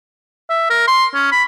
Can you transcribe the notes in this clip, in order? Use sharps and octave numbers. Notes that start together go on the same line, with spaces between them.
E5
A#4
C6
C#4
B5